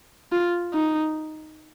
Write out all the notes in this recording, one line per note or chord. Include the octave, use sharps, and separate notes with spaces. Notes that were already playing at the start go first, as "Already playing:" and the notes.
F4
D#4